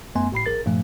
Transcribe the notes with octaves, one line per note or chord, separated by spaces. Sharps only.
F#2 A3 B3 G#5 C6
G#1 A2 B5 C7
A#1 A#4 A6
G2 A#2 F3 A3